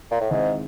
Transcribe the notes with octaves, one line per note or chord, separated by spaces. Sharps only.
A#2
A2
G#2 D#3 G#3 C4 E4